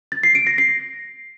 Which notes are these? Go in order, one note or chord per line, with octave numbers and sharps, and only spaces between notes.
A6
C7
D7
A#6
C7